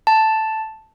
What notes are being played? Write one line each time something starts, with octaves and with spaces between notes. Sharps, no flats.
A5